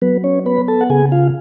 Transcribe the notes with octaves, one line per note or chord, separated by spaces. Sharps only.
F#3 B3 B4
C#4 C#5
B3 B4 B5
A4 A5
F#5
C#3 G#4 G#5
F4 F5